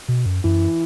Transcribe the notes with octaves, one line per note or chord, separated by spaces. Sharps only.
B2
F#2
F#2 E3